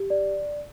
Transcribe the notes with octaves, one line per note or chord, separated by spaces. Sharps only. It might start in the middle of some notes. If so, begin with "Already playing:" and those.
Already playing: G4
D5